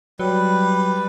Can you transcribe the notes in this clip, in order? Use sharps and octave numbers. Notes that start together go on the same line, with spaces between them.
F#3 G3 B4